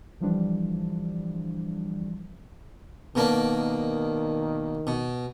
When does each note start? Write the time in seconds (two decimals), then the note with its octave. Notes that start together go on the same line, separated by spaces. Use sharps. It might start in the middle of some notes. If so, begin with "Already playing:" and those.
0.20 D3 E3 F3 G3 D4
3.15 B2 D#3 A#3 D4
4.87 B2